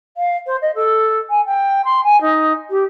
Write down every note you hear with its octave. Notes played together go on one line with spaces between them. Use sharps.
F5
C5
D#5
A4
G#5
G5
C6
G#5
D#4
G4